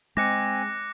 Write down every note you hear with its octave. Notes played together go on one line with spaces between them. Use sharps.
G#3 C4 G#5 D6 F#6 A#6 C#7